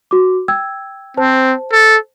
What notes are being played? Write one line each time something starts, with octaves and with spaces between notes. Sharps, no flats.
F#4 D6
G5 E6 G#6
C4 C5 A5
A4